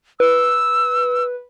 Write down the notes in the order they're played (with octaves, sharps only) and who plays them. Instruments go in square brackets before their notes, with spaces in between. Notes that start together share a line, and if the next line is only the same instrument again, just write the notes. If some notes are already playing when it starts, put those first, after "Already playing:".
[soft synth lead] B4 [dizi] E6